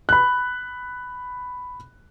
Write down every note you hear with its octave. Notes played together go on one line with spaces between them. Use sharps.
B5 F#6